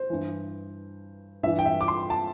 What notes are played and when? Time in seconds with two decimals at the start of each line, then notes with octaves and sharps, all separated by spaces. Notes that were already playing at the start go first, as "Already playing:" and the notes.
Already playing: C5
0.10 G2 E3
1.43 G2 E5
1.47 E3
1.59 G5
1.65 E5
1.81 D6
1.88 C6
2.10 A5